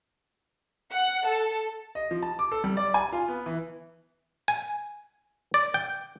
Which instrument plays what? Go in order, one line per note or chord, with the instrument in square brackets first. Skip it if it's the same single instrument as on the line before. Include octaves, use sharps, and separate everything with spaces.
[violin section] F#5
A4
[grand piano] D#5
F3
A5
D6
A4
G3
D5
G#5
F4
B3
E3
[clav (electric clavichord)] G#5
D5
G5